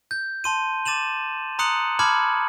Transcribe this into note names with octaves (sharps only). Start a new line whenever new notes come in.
G6
A5 C6 D#7
D6 A6 D#7 E7 F#7
A#5 C6 D#6 F#6 C#7 F#7
A5 B5 D6 F6 G#6